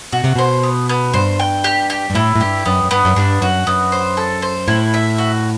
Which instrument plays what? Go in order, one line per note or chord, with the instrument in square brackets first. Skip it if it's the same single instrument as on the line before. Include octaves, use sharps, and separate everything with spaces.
[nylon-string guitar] B2 [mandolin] F#4
[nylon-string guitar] C3
[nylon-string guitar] B2 [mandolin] C5
[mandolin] B3
B3
[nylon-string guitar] G2 [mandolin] C5
[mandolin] G5
G4
G4
[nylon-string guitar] G2
[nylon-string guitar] A2 [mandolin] E4
[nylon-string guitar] A2
[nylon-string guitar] G2 [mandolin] G4
[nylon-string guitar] F#2 [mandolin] B3
[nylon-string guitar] F#2
[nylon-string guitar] G2 [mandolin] B3
[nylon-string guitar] F#2
[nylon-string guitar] G2 [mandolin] D4
[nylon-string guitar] F#2 [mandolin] F#4
[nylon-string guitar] F#2 [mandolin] B3
[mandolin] C5
A4
C5
[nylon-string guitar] A2 [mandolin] E4
[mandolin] E5
F#4